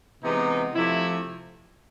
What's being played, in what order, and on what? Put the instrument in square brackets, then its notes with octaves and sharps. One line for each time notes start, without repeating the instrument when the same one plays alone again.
[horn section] C3 E3 G#3 B3 D#4
C3 F3 A3 E4